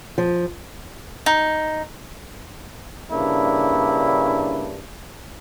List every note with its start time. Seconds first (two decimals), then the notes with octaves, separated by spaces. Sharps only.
0.18 F3
1.26 D#4
3.12 G2 C#3 A#3 D4 E4